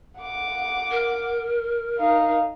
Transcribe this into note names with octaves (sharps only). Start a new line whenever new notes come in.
F#5 D6
A#4
D#4 F5